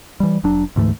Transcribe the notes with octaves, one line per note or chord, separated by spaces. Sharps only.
E3 G3
F1 F#3 D4
D2 G#2 E3 A3